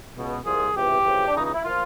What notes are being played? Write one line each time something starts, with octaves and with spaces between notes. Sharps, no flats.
C#2 B2
C2 A#2 F3 G#4
C#2 C3 E3 G4
F2 C#3 E3
D4
C#2 C#3 E3 D#4
D#4
E4
A#2 F3 F4